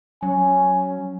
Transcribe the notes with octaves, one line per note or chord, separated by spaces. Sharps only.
F#3 C#4 G#5